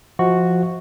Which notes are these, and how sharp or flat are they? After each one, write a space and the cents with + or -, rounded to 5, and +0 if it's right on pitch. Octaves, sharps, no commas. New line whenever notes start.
F3 +0 F#4 +0 D#5 +40